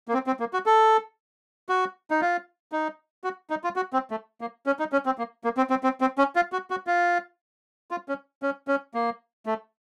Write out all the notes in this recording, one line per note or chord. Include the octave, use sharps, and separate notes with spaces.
A#3
C4
C4
A#3
F#4
A4
F#4
D#4
F4
D#4
F#4
D#4
F4
F#4
C4
A3
A#3
C#4
D#4
C#4
C4
A#3
A#3
C4
C4
C4
C4
C#4
F4
F#4
F#4
F4
F4
C#4
C#4
C#4
A#3
A3